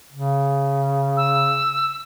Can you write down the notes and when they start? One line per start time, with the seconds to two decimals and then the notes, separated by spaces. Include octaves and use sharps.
0.12 C#3
1.17 E6